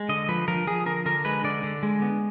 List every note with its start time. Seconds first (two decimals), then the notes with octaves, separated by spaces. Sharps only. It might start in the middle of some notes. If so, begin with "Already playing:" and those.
Already playing: G#3
0.09 D3 D#5
0.29 F3 B4
0.48 F3 A#4
0.67 F3 G#4
0.86 D3 A#4
1.06 D3 A#4
1.25 G#3 B4
1.44 D3 D5
1.63 D3
1.83 G#3
2.02 B3